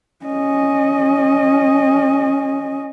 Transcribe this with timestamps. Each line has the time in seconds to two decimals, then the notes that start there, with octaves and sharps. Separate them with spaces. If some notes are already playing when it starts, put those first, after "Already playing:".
0.25 C#4 D#5